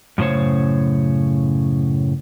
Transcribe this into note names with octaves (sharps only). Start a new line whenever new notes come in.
F#2 A2 C#3 C5 C#5